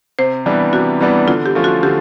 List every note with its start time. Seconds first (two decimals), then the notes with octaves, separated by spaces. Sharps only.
0.19 C3 C5
0.46 E3 G3 B3 D4
0.73 C3 F#4
1.00 E3 G3 B3 D4
1.28 D3 F4
1.46 G4
1.55 F3 A3 C#4 F4
1.64 F#4
1.83 D3 G4